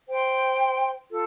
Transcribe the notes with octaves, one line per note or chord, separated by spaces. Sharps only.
C5 G5 C6
F4 A4